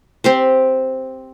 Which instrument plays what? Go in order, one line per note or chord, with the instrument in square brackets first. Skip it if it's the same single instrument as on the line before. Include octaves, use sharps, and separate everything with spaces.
[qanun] C4 G4 C5